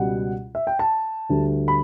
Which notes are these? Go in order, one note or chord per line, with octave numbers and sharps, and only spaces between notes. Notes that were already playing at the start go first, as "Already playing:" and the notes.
Already playing: C#2 B2 G3 F#5
E5
G5
A5
D2 D3 G3
B5